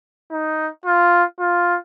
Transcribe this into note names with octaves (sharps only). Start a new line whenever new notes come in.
D#4
F4
F4